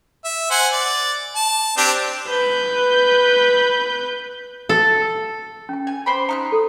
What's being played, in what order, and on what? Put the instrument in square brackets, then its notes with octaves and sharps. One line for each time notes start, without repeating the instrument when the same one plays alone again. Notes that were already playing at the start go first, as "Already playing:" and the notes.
[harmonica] E5
C5 F#5 G#5
D5
A5
C4 D4 G4
[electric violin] B4 G6
[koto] A4
[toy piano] C#4 G5
[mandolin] G#5
C5 D5 B5
[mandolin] D#4 F6 F#6 [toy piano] A#5
[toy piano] A4